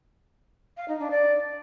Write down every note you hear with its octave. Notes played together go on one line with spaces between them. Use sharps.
F5
D#4
D4
D5